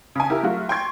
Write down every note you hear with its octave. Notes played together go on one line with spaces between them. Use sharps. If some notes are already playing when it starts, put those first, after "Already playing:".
C#3 G#5
E4 G4 A#4
F#3 A3 F4 F#4
G5 C6 C#6 G#6